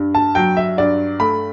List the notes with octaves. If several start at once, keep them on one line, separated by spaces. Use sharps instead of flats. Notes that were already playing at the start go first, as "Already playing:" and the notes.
Already playing: G2
A5
F#3 G5
E5
G2 D5
A3 B5